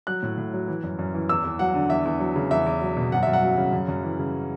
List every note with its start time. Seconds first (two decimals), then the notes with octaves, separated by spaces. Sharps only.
0.07 F#3 F#6
0.23 A2
0.38 A2
0.54 F#3
0.68 E3
0.84 F#2
0.99 F#2
1.14 E3
1.29 E2 E6
1.44 E2
1.59 F#3 F#5
1.74 D3
1.90 E2 E5
2.05 E2
2.20 F#3
2.36 C#3
2.51 E2 E5
2.66 E2
2.81 F#3
2.96 B2
3.12 F#2 F#5
3.23 F#2 E5
3.33 F#5
3.42 F#3
3.57 C#3
3.73 F#2
3.88 F#2
4.04 E3
4.19 C#3